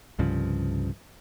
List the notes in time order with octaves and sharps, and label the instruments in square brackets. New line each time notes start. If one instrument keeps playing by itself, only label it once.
[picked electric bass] C2 G2 C#3 F3